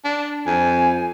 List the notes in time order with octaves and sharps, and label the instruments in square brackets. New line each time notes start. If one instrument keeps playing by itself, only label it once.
[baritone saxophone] D4
[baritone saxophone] F2 [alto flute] G#5